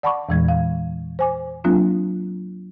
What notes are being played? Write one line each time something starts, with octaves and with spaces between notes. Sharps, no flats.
D5 F#5 A5 B5 C#6 D6
E2 A#2 E3 G#3 G#6
F5
C5 G#5 D6
F#3 A#3 C4 D4 F4